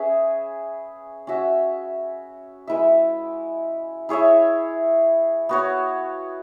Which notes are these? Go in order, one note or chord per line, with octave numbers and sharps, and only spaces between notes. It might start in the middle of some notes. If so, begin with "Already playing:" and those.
Already playing: C#4 G#4 B4 E5
C#4 F#4 E5
G#3 E4 B4 E5
E4 G#4 C#5 E5
B3 F#4 C#5